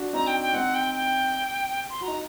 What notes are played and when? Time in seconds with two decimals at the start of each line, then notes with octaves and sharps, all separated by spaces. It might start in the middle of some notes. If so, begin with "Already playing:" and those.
Already playing: D4 F#4
0.13 C4 D#4 A#5
0.27 G5
0.40 G5
0.54 C4 D#4 F#5
0.74 G5
0.94 G5
1.89 C6
2.01 F#4 A#5
2.08 D#4